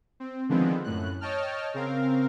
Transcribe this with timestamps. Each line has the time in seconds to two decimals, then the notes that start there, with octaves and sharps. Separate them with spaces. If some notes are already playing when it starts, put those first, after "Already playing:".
0.20 C4
0.49 D3 D#3 F3 G#3 B3 C4
0.84 F#2 A2 F#6
1.21 C#5 D#5 G5 A5 F6
1.74 C#3 C4 A#4 F5